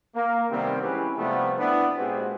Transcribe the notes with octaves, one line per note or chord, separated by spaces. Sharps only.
A#3
C3 D#3 G3 A3 B3 C4
E3 G#3 C#4 G4 B4
C3 F3 G3 A3 B3
B3 D4 E4 B4
A#2 G#3 B3 C4 F#4 G4